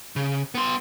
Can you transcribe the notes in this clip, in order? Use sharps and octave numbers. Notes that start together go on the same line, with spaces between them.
C#3
B3 C6